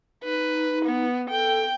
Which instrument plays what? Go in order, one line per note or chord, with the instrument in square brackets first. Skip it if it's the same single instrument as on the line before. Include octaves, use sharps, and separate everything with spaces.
[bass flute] D#4 [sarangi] B4
[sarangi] B3
[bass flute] A4 [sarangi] G5